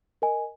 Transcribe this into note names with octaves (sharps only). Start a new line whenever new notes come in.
A#4 D#5 G#5